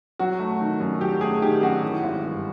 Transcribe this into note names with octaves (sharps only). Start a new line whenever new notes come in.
F#3 F#4
A3
D#3
F#2
F#3 G4
A3 G#4
D#3 G4
F#2 F#4
E3
G#1
G2